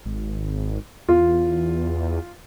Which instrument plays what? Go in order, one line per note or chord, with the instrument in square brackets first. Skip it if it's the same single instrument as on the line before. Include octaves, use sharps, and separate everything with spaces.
[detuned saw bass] G#1
[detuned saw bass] E2 [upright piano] F4